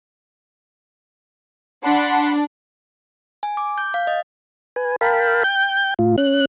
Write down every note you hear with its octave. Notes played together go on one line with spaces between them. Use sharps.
D4 F#5 B5 C6
G#5
D6
G6
F5
D#5
B4 G#5
A#4 F5 G5 A5 B5
G5 G6
A2 F4
C#4 F#6